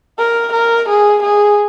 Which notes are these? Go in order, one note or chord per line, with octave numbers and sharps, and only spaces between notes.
A#4
A#4
G#4
G#4